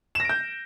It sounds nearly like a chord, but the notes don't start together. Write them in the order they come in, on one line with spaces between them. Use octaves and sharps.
E7 A#6 D7 G6